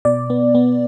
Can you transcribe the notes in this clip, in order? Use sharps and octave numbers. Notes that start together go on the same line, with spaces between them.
B2 D5
B3
B3